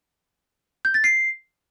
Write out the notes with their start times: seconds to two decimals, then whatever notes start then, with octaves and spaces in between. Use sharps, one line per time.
0.85 G6
0.94 A6
1.04 C7